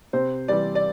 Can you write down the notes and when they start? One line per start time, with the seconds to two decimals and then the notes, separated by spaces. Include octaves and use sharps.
0.13 C3 C5
0.48 E3 G3 D5
0.75 D5